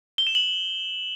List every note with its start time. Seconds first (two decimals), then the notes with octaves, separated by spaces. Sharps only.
0.18 G7
0.27 E7
0.35 F#7